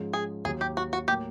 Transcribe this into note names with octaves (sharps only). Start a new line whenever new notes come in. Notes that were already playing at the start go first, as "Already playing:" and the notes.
Already playing: G#2 F3 G#3 C#4
G#4
D#2 D#3 F#3 G#4
G4
F#4
F#4
A2 F#3 A#3 G4